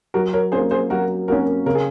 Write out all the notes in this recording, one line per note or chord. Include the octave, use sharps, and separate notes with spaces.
F#3 F#4 A#4
A#4 C#5
A#3 C#4 G#4 C5
G#4 C5
F#3 F#4 A#4
A#3 C#4 F#4 A#4
C#3 A#4
G#4